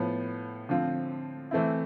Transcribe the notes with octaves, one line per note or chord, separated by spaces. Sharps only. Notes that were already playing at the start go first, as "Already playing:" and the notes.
Already playing: A2 F3 B3
D3 F3 C4 F4
E3 A3 C4 E4